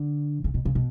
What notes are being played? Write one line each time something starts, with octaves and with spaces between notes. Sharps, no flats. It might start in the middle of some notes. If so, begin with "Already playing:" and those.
Already playing: D3
C#3
B2
C#3
B2